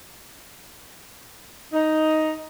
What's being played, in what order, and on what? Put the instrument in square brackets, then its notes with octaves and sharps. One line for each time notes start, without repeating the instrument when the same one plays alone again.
[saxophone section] D#4